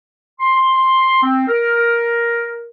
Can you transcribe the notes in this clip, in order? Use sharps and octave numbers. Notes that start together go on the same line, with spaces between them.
C6
C4
A#4